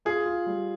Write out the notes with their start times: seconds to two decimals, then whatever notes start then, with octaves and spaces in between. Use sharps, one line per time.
0.05 F4 G#4
0.26 F4
0.46 G3